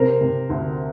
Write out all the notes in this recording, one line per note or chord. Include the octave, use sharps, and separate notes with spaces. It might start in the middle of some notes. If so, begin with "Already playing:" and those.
Already playing: C3 A#4 C5
C3
D2